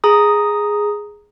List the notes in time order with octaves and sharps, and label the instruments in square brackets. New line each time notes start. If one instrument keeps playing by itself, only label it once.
[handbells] G#4 A#5 D#6